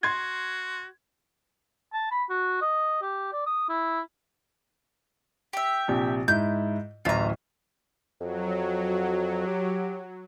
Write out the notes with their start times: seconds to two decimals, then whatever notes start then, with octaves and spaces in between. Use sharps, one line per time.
0.03 F#4 C6 G#6
1.94 A5
2.11 B5
2.30 F#4
2.62 D#5
3.02 G4
3.33 D5
3.47 D#6
3.69 E4
5.53 G4 E5
5.88 A#1 C3
6.28 G#2 E4 G6
7.05 D1 A1 F4 E5 A#5
8.21 F2 F#3
9.47 G4